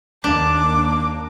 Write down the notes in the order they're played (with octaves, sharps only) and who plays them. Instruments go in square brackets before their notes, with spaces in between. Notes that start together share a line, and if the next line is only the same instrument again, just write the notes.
[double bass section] D#2 A#3 [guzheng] D4 [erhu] D6